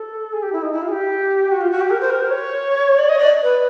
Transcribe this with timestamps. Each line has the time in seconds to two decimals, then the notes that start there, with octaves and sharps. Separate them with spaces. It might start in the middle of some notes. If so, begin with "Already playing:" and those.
Already playing: A4
0.33 G#4
0.43 G4
0.53 E4
0.62 D#4
0.73 E4
0.82 F4
0.88 G#4
0.92 G4
1.51 F#4
1.61 F4
1.71 F#4
1.81 G4
1.91 A#4
2.00 C5
2.10 A#4
2.20 C5
2.30 C#5
2.99 D5
3.09 D#5
3.19 D5
3.43 B4